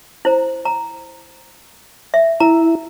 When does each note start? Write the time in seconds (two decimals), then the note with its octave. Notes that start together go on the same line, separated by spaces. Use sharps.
0.25 E4 C5 A#5
0.65 A#5
2.14 E5
2.40 E4 A#5